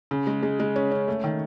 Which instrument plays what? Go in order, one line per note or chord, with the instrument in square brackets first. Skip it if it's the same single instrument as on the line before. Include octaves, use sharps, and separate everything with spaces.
[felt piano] C#3
G#3
G#3
G#3
C#4
C#4
A3
D#3